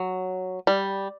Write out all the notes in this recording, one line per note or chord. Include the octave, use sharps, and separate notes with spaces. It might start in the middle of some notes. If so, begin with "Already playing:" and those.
Already playing: F#3
G3